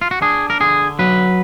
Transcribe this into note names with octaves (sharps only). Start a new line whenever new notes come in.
F4
F#4
D4 G#4
A#4
D3 G#4
F#3 B4